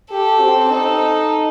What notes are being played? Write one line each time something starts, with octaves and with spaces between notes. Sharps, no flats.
G4 A4
C4
D#4 A4